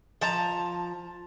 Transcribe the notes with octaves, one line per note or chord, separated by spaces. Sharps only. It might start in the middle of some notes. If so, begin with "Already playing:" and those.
F3 A5 A#5